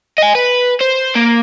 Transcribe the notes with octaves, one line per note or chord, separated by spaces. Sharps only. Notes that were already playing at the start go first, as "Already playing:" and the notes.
D#5 G#5
B4
C5
A#3